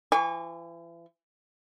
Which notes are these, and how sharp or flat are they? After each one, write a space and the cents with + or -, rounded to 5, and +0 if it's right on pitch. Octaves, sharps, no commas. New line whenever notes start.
E3 +40 G#5 -40 C#6 +35